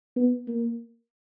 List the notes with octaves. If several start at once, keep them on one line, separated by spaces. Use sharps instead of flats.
B3
A#3